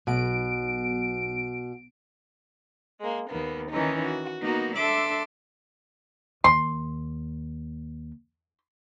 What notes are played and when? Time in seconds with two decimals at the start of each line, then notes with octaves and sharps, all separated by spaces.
0.07 B1 B2 D7
3.00 G#3 A#3
3.30 D#2 A#3 B3
3.71 D#3 E3 C#4 D#4
4.04 F#4
4.42 A#3 B3 D#4 F#4
4.76 D4 A4 E5 C6 D6 E6
6.44 D#2 C6